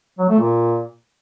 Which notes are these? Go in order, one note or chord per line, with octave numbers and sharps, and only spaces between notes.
F#3
A3
A#2